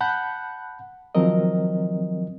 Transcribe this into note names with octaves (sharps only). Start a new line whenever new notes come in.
F#5 A5 B5 F#6 G6
D#3 F3 F#3 C4 A#4 D#5